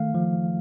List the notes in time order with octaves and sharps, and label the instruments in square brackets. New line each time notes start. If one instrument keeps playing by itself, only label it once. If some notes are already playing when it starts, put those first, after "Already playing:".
Already playing: [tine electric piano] D#3 A3 F5
F3